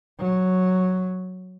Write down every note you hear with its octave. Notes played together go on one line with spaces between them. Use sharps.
F#3